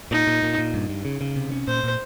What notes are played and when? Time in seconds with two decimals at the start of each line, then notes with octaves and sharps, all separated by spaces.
0.11 A#2 D#4
0.27 A#2
0.43 A#2
0.58 A#2
0.74 G2
0.89 G2
1.05 C#3
1.21 C#3
1.36 C3
1.52 C#4
1.68 A#2 C5
1.84 A#2